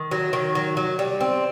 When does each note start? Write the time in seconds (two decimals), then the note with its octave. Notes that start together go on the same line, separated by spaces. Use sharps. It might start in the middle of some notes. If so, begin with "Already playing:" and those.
Already playing: D#3
0.11 F#3
0.33 D#3
0.55 F#3
0.77 F#3
0.99 G3
1.21 C4